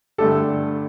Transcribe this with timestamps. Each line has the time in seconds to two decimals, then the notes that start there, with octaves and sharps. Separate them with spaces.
0.18 G2 D3 A3 D4 G4 A4